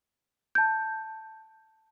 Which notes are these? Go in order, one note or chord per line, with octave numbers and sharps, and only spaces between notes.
A5 G6